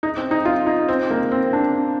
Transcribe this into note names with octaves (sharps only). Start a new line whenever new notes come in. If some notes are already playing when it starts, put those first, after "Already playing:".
D#4
C4
D#4
F4
D#4
C4
A#3
C4
D4